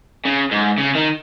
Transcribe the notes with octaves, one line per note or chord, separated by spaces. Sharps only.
C#3
G#2
C#3
D#3